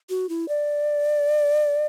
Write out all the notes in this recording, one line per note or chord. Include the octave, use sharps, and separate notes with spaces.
F#4
E4
D5